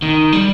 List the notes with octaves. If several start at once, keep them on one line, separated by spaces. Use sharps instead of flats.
D#3
G3